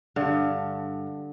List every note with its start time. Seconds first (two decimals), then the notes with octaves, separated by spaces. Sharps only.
0.16 G2 D3